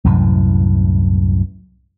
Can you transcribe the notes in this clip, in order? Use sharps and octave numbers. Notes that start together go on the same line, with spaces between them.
C2 F#2 A2 E3